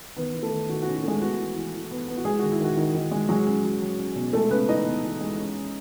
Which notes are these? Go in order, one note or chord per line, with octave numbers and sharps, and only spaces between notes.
D#3 B3 B4
D#3
A3 A4
D#3
D#3 F#4
F#4
C#4
F#4
G#3 A3 G#4
B3 F#4
E3
E3
E3
B3
B3
F#4
G#3 G#4
D#3 F#4
E4
D#3 F#4
D#3
D#3
G#3
F#3 G#3 G#4
C#4
F#3
F#3
C#4
B2
G#3 A3 A4
C#3 B3 B4
E3 D#4 D#5
B3
E3
G#3
C#4
C#4